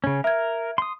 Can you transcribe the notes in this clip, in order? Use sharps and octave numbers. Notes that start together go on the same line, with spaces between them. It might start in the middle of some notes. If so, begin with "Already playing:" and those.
C#3 C#4
A#4 E5 G#6
C6 D#6